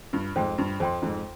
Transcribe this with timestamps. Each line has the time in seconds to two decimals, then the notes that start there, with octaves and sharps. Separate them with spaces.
0.13 G2 F4
0.36 F2 G#2 C5 G5 C6
0.58 G2 F4
0.80 F2 C5 G5 C6
1.02 F2 G#2 F4